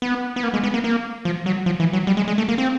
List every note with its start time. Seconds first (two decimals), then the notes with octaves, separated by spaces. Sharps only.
0.02 B3
0.36 B3
0.44 A#3
0.54 G#3
0.63 B3
0.74 A#3
0.84 A#3
1.25 F3
1.46 F#3
1.66 F3
1.80 E3
1.93 F#3
2.07 G3
2.17 G#3
2.28 G#3
2.38 A3
2.48 A#3
2.58 C4